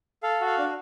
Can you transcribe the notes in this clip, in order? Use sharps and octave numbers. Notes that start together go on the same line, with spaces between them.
A4 F5
F#4 F5
D4